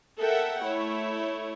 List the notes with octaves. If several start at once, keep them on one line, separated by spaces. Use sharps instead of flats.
A4 A#4 E5 F#5 G5
A3 E4 C#5